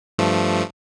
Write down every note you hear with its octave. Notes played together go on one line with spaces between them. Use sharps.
G2 F3 A3